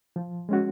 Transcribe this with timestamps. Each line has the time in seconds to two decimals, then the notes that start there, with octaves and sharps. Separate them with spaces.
0.16 F3
0.49 G#3 C#4 F#4